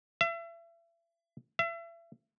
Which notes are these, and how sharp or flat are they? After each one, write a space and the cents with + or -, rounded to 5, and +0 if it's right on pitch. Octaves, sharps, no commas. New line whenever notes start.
E5 +35
E5 +35